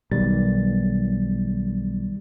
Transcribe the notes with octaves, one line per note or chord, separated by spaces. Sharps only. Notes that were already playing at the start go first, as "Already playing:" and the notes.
B1 D#3 G3 A6